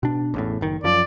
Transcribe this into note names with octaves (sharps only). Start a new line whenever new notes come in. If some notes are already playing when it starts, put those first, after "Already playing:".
B2 D4
A1 E2 A2
F#1 D#3
F#2 F3 D5